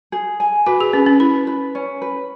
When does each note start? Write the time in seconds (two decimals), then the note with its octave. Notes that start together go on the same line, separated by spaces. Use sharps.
0.12 G#4
0.40 G#5
0.66 F#4 B4
0.81 G#4
0.93 C#4 B4
1.06 C#4
1.20 E4 B4
1.47 B4
1.75 C#4
2.02 B4